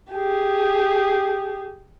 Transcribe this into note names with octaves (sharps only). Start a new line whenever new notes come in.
G4 G#4